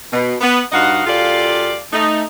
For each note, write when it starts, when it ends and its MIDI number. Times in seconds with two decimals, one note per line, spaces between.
0.13 0.35 47
0.41 0.61 59
0.72 1.03 43
0.72 1.03 63
0.72 1.03 66
0.72 1.03 75
0.72 1.03 77
0.72 1.03 78
1.06 1.76 42
1.06 1.76 65
1.06 1.76 67
1.06 1.76 69
1.06 1.76 74
1.06 1.76 77
1.92 2.23 57
1.92 2.23 63